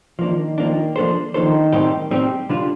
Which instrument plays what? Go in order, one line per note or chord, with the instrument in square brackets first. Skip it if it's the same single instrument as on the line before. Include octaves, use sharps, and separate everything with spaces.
[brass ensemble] D#3 [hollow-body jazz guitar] F3 A#3 D4
[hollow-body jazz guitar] F3 A#3 D4
F3 A#3 D4 A4 C5
[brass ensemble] D#3 [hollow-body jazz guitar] F3 A#3 D4 A4 C5
[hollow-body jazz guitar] A2 G3 C4 D#4 G4
A2 G3 C4 D#4 G4
D3 G3 D4 F4